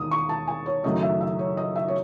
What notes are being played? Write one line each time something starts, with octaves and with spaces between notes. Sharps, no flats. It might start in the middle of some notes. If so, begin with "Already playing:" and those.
Already playing: E1 D#2 D#3 D#6
C#6
A5
G#5
C#5
F#1 F#2 D#3 A3 D#5
E5
E5
C#5
D#5
E5
C#5